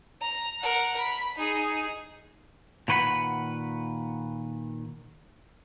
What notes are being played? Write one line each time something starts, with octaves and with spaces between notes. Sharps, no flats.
A#5
A#4 F#5
B5
D#4 G#4
A#2 D#3 B4 C5 F#5 B5